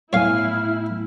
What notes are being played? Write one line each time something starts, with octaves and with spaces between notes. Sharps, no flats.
A2 B3 E4 C#5 F5 G#5 F6